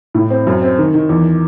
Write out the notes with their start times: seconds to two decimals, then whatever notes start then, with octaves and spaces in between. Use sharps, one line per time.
0.14 A2
0.30 C4
0.47 F#2
0.62 C4
0.78 D#3
0.94 D#3
1.09 E2